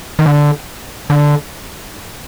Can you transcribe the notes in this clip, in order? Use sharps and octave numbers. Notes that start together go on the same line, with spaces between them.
D#3
D3
D3